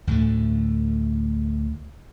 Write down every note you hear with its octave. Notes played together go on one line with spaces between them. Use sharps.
D2 A2 D3 A3